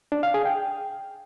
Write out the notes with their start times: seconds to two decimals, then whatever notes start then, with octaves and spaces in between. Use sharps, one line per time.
0.12 D4
0.23 F5
0.34 G#4
0.45 G5